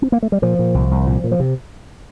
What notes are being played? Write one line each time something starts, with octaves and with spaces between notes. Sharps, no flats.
C4
A#3
A3
G3
A#2 F3
A#2
C2
C2
A#2
A#2
F3
C3